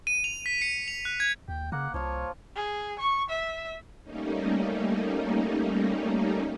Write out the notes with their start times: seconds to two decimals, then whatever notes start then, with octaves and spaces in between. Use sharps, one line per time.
0.07 D#7
0.24 F7
0.46 B6
0.62 C#7
0.88 F7
1.05 F#6
1.20 G#6
1.48 D#2 G5
1.72 C#3 A#3 F#5
1.94 C2 F3 F4 C#5
2.56 G#4
2.99 C#6
3.30 E5
4.03 G3 A3 A#3 C#4 D#4